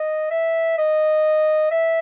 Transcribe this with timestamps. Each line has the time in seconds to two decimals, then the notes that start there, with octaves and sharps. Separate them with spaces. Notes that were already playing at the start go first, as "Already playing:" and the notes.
Already playing: D#5
0.31 E5
0.78 D#5
1.71 E5